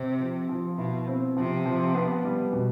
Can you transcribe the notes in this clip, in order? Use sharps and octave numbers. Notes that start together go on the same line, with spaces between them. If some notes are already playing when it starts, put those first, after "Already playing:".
Already playing: C3 C4
F3
F3
B2 E4
C4
C3 F3
F3
B3
G3
B2